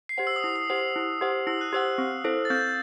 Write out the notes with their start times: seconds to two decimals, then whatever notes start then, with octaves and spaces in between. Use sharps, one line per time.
0.09 C7
0.18 G4 C5 F#5
0.27 E6
0.36 D#6
0.44 E4
0.56 D#6
0.70 G4 C5 F#5
0.96 E4
1.21 G4 C5 F#5
1.47 E4 E6
1.61 F#6
1.73 G4 C5 F#5 E6
1.98 C4
2.24 E4 A4 C5
2.45 A6
2.50 C4 G6